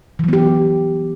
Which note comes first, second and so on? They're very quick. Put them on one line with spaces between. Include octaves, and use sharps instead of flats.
E3 F#3 B3 G4